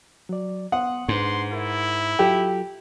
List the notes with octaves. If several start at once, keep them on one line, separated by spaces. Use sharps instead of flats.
F#3 D5
B3 F#5 C6 D#6
G#2 D4 B4 C6
E4 A#4 E5
F#3 F4 G4 A4